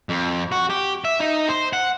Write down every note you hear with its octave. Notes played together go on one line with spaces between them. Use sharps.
F2
F#4
G4
E5
D#4
C5
F#5